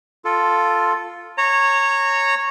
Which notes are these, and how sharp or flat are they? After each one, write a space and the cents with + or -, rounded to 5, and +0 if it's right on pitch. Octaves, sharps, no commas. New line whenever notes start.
F4 +0 A4 +0
C#5 -10 A#5 -20